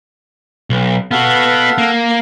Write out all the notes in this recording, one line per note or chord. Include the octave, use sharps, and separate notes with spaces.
B1
B3 F#4 A4 F5 F#5
A#3